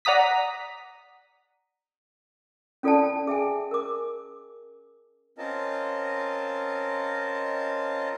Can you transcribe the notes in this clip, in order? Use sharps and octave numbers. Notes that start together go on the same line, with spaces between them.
D5 F#5 A#5 D#6 B6
C#4 F4 A4 D5 G5 A5
G#4 E5 G5 G#5
A#4 D6
C4 C#4 F4 A#4 D#5 A5